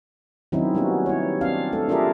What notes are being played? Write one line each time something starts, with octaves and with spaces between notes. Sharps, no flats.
D#3 F#3 C4 C#4 D#4 E4
G3 A#3 B3 C#4 F#4
E4 C#5
C4 D4 F5
A3 A4
D4 F4 G4 G#4 A#4 E5